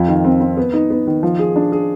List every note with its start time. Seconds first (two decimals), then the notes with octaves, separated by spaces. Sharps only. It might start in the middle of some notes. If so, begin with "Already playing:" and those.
Already playing: F2 F4
0.08 D#3
0.24 C4
0.41 C4
0.57 B3
0.73 D#4
0.90 B3
1.07 D#3
1.23 F3
1.39 G#4
1.56 D4
1.72 G#4